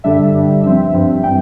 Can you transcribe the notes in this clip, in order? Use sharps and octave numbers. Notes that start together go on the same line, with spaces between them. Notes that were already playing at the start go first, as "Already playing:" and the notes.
G2 D3 G3 D4 E5
G2 D3 G3 D4
G2 F3 C4 E5
G2 F3 C4
E3 G3 G5